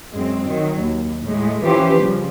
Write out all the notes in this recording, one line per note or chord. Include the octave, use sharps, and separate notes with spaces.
F#2 G#3 C4
D#3 F#3
D#2
A2 G#3 A3
E3 F3 C#4 G4 B4 C5
C#3 F3 G3